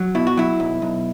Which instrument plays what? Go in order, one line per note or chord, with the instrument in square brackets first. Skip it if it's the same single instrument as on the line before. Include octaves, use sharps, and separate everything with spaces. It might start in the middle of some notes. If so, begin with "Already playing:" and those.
Already playing: [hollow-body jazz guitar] F#3
B2 E4
F#4
F#3 E4
B1
B1